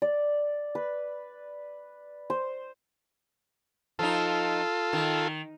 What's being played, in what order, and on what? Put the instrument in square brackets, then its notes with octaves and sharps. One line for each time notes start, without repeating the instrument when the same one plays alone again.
[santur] D5
B4
C5
[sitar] F3 D#4 [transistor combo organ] F4 A4
[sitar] D#3